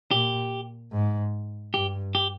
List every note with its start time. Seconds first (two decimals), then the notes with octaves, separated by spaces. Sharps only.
0.11 A#2 G4
0.92 G#2
1.74 G2 G4
2.15 G4